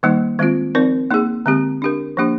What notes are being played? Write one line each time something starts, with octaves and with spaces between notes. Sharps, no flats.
D#3 G3 A#3 D#4
D#3 G#3 C4 F4
F3 C4 D#4 A#4 D5
A#3 D#4 G#4
D3 G#3 C4 G4
D4 G4 A#4
F3 A#3 D4 G4